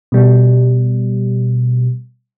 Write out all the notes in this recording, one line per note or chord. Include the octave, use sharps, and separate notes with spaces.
B2 G3